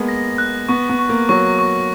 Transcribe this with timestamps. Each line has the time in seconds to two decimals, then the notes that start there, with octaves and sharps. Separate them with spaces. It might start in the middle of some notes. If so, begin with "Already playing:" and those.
Already playing: G#3 A#3 B3
0.09 A#6
0.38 F#6
0.68 B3 C#6
0.89 B3
0.99 C#6
1.09 A#3
1.29 F#3 C#6
1.59 C#6